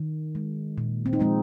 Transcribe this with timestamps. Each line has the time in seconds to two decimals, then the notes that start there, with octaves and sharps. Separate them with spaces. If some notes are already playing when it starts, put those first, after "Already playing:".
Already playing: D#3
0.35 G#3
0.78 A#2
1.06 C4
1.13 D#4
1.19 F3 G#3 C4